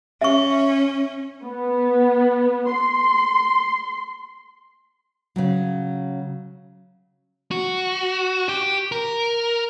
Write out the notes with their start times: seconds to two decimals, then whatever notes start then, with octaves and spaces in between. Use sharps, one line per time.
0.21 C#4 E5 C#6
1.44 B3
2.71 C6
5.36 C#3 F#3
7.51 F#4
8.49 G4
8.92 A#4